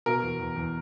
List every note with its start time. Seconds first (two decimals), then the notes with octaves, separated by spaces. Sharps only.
0.06 B2 A#4
0.23 E2
0.40 E2
0.56 E2